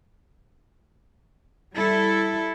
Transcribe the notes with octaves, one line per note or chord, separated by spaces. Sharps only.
G3 E4 A4